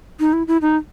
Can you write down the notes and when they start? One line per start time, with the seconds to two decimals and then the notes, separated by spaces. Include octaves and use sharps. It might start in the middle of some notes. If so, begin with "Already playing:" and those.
0.20 D#4
0.33 E4
0.48 E4
0.62 D#4